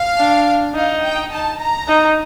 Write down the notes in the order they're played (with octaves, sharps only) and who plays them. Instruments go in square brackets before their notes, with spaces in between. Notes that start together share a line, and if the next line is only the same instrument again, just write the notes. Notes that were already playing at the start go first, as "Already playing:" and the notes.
Already playing: [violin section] F5
[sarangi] D4
[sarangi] D#4 [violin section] F5
[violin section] G5
A5
A#5
[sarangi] D#4